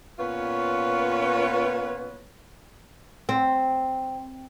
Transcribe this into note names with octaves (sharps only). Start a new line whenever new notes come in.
A#2 B3 C#4 F4 B4 C#5
C4